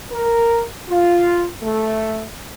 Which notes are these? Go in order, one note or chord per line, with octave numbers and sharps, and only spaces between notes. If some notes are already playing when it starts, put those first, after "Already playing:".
A#4
F4
A3